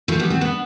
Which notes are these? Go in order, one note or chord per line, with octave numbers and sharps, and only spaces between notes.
F3 A3
G3 B3
A3 C4
B3 D4